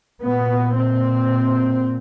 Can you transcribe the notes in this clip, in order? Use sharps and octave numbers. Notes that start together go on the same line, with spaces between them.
A#2 B3
C4